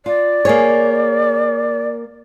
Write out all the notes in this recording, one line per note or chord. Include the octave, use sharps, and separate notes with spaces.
F4 D5
A#3 G#4 C#5